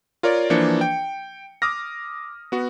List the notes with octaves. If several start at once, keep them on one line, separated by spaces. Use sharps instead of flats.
F4 A#4 C#5 D5
E3 F3 A#3 D4 C#7
G5
D6 D#6 F6 A#6
B3 F#4